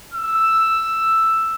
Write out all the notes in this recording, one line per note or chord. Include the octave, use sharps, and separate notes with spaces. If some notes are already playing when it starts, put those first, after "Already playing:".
E6